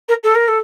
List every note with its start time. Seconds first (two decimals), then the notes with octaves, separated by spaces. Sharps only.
0.08 A#4
0.23 A4
0.35 A#4
0.48 A4